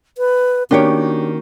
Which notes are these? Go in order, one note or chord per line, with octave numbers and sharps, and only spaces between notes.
B4
D#3 A#3 C#4 D4 F#4 G4 C#5